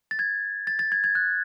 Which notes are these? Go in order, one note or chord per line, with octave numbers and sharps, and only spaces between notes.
A6
G#6
A6
A6
G#6
G#6
F#6